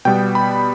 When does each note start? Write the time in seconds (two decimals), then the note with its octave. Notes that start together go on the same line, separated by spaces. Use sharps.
0.05 B2 G3 B3 G5
0.35 B5